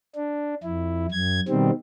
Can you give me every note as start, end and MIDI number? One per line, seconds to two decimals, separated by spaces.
0.15 0.54 62
0.64 1.07 41
0.64 1.07 64
1.11 1.40 42
1.11 1.40 92
1.48 1.71 47
1.48 1.71 51
1.48 1.71 55
1.48 1.71 60